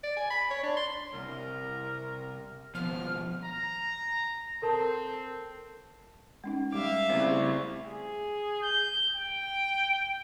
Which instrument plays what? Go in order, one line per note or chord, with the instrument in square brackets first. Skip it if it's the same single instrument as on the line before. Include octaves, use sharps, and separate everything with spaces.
[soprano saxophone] D5
G#5
B5
C#5
D4
C6
[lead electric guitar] C2 [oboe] A#4
[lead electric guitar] D#2 B2 [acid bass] F3 [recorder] F6
[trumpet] A#5
[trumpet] C4 [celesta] A4 A#4 A5
[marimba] G#3 C#4 D#4
[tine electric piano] G3 D6 [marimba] G#3 [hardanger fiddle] E5 F5
[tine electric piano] C#3 G3 [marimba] A3 [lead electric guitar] C4 E4
[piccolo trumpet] G#4
G6
G5